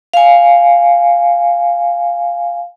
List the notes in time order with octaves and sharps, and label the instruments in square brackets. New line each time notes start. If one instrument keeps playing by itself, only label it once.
[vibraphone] F5 G#5